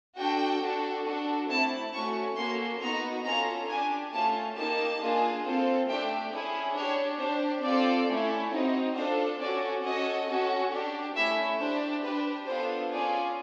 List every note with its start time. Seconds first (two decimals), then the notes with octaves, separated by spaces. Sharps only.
0.18 D4 F#4 A4 G5
0.62 D4 F#4 A4
1.06 D4 F#4 A4
1.49 A3 C4 E4 A5
1.93 A3 C#4 F#4 C#6
2.37 A#3 C#4 F#4 A4 C6
2.81 B3 D#4 F#4 A#5
3.25 C#4 F4 A4 A#5
3.69 D4 G4 G#5
4.13 A3 C#4 F4 A5
4.57 A#3 D#4 G4 A5
5.00 A#3 D4 F4 G#4
5.45 C4 F4 A4
5.89 A3 D4 G4 G5
6.33 C#4 E4 G#4
6.76 D4 G4 C#5
7.20 D4 G4 C5
7.64 C4 F4 A4 D5
8.08 A3 C#4 E4
8.52 C4 D#4 F#4
8.96 D4 F4 A4 C5
9.40 C#4 F#4 A4 D5
9.83 C#4 F#4 A4 D#5
10.27 C#4 F#4 A4
10.71 D4 G4
11.15 A3 C#4 E4 E5
11.59 D4 G4 C5
12.02 D4 G4 B4
12.46 B3 D4 F4 A4 C5
12.91 C#4 F4 G#4 D5